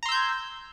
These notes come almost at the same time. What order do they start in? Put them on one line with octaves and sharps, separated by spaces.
A#5 C6 E6 G6 G#6